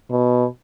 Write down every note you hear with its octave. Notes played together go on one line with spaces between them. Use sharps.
B2